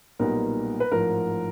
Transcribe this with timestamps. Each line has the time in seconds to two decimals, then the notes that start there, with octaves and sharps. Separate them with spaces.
0.19 B1 A#2 G3 B3 D#4 A#4
0.80 B4
0.91 A1 G#2 F3 A#4